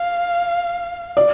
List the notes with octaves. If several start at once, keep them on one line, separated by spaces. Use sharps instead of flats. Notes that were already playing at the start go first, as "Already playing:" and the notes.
Already playing: F5
D5